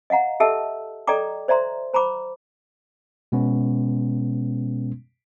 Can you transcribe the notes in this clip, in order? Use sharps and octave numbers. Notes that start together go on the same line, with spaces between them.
D#5 F5 F#5 A#5
G4 A4 D#5 E5 A5 E6
A4 D5 D#5 G5 A#5 D6
C5 D5 E5 A#5 C6
C5 A#5 B5 D6
B2 G#3 B3 C#4